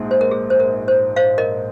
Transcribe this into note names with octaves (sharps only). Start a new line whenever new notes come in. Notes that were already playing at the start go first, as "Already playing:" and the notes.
Already playing: A#1 G#2 G#3
C5
A#4
G#4
C5
A#4
C5
C5 F5
A#4 D#5